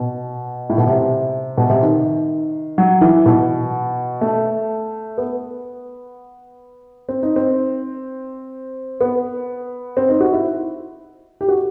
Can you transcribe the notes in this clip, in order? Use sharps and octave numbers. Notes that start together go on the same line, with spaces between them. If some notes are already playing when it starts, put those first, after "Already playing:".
Already playing: B2
A2
B2
C3
B2
C3
D#3
F#3
E3
B2
A3
B3
C4
D#4
C4
B3
C4
D#4
F#4
E4
G4
F#4